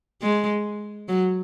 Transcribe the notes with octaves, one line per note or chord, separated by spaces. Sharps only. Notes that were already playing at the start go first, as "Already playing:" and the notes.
G#3
F#3